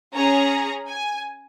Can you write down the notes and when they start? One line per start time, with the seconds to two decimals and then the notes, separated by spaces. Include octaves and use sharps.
0.14 C#4 G#4 A#5
0.91 G#5